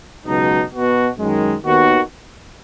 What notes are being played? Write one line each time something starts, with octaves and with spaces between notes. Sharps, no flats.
C#2 B2 F#3 D#4
B2 B3 F#4
F#2 D#3 G#3
D#2 D#3 B3 F#4